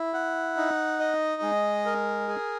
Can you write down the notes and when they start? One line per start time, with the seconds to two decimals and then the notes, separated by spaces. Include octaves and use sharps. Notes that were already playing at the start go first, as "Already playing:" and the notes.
Already playing: E4
0.14 F#5
0.57 D#4
1.00 D#5
1.42 G#3
1.86 A#4
2.28 G#4